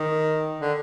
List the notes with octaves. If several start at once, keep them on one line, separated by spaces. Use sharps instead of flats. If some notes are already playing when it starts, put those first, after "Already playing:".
Already playing: D#3
D3